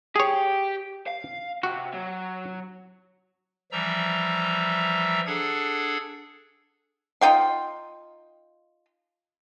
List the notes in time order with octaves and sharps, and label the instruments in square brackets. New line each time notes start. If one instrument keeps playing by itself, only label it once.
[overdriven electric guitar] G4 [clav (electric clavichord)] G#4 C#5
[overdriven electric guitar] F5
[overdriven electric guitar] C3 [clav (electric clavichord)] F#4
[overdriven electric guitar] F#3
[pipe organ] E3 F3 G3 E5 A#5 E6
D4 G#4 A4 F#5 G#6
[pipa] D#4 F4 G5 C6